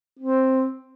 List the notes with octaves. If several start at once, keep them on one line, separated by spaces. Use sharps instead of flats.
C4